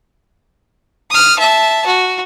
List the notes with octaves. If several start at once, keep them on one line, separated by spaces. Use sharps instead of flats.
D#6 F6
E5 A5
F#4